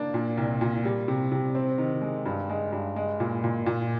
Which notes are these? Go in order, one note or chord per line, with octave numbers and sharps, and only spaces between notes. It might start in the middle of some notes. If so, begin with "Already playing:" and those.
Already playing: A#3 D4
A#2
C2
A#2
G3
C3
C3
C4
D#3
G#3
G2
G#3
G2
G#3
A#2
A#2
A#2